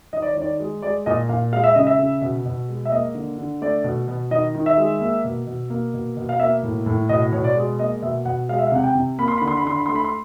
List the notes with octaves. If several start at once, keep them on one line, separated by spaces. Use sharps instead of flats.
D#3 D#5
D5
C#5
D#3 D5
G#3
G#3 D5
A#2 D#5
A#2 F5
G#3 F5
E5
C#3 D#5
E5
C#3
B2
B2
G#3
E5
A#3 D#5
D3
D3
A3 D5
B2
B2
D#3 D#5
D#3
E5
G#3
A#3
B2
B2
A#3
B2
B2
F5
A#3 E5
A2
A2
B2 D#5
B2 C#5
D5
G#3
A#3 D#5
B2 E5
B2 F#5
G#3 F5
E5
F5
C3 F#5
G5
C3
A#3 B5
C6
D3 B5
C6
B5
D3 C6
B5
A3 C6
B5
C6